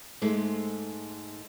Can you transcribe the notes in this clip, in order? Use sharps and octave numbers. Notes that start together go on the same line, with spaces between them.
G#2 G#3 A3